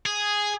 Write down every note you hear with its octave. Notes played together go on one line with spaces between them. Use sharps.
G#4